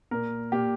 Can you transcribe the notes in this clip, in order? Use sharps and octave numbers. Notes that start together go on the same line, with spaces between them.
A#2 A#4
A#2 G4